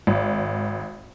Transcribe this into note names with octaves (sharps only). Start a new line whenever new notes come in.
G#1